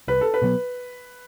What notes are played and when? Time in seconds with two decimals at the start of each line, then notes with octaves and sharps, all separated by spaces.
0.07 C2 B4
0.21 A4
0.34 B4
0.42 B2 F#3 B3